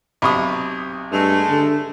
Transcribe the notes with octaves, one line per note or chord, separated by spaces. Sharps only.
B1 C3 B5 C#6 D#6
G2 G#3 A3
D3